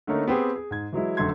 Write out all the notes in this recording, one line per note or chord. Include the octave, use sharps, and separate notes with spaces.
D3 A3 A#3 C#4 D#4 A#4
B3 C4 G4 G#4
G#4
G#2 G#6
E3 F#3 G#3 E4
F1 F#2 D3 A3 C6 G#6